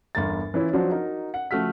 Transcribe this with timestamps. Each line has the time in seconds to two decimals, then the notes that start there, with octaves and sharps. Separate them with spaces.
0.15 G1 E2 A#4 A6
0.54 E3 C#4 E4 F4
0.73 F3 F#3 D4 F#4 C5
0.92 D#4 F#4 A#4
1.34 F#5
1.51 C#3 F3 A3 F#4 F6 B6